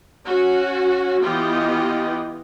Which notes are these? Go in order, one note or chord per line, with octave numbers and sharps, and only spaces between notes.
C#4 F#4
E3 B3 F4 G4 D#5